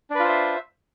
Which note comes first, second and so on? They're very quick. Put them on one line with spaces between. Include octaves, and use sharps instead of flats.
D4 B4 F4 C5 E5